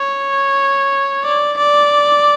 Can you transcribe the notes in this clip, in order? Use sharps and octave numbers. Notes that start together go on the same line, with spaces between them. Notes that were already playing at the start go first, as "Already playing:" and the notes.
Already playing: C#5
D5
D5